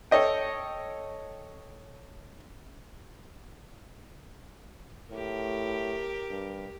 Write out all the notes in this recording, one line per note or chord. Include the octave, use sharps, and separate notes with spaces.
A4 C#5 D#5 G5
A2 G4 A#4
G2